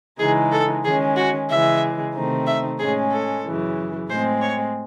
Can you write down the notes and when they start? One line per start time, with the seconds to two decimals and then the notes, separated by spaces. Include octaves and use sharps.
0.19 C#3 E3 G#3 D#4 G#4
0.52 A4
0.84 D#3 G#3 C#4 G#4
1.16 F#4
1.49 C#3 E3 G#3 E5
2.14 C3 D#3 A3 C4 D#4
2.47 E5
2.79 A2 G#3 C#4 G#4
3.12 A4
3.44 F#2 C#3 E3
4.09 A2 G#3 C4 C5
4.41 C#5